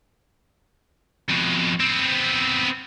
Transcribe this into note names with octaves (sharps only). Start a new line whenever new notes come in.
F2 B2
B3 C4